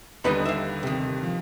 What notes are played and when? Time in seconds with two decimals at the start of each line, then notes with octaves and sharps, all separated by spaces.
0.24 D#2 D3 G3 D#4 B4 D#5
0.45 E5 F5
0.83 C3 D#3
1.23 F3